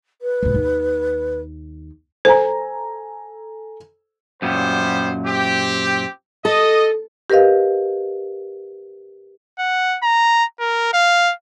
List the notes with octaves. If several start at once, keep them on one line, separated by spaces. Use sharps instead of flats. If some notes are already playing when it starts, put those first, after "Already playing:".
B4
C#2 G#2
D#2
A4 C5 G#5 A#5
F#2 A#2 G3 B3 C5
C4 G4
A4 D#5
G4 A#4 B4 D#5 F5
F#5
A#5
A#4
F5